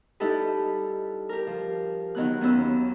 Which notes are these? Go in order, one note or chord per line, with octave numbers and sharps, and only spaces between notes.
G3 D#4 E4 G4 A4 B4
G4 A#4
F3
D#3 F#3 B3 F#6
D#2 B3 C#4 E6